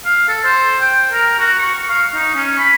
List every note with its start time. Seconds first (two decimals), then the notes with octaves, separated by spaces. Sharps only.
0.05 F5
0.28 A4
0.44 C5
0.81 G5
1.12 A#4
1.39 F#4
1.59 C#6
1.89 F5
2.15 D#4
2.35 C#4
2.58 B5